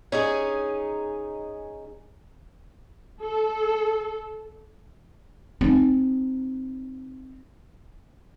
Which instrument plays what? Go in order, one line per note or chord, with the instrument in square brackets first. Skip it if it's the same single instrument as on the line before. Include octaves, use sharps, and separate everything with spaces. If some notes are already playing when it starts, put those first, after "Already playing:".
[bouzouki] C#4 D#4 G#4
[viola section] A4
[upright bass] C4 D#4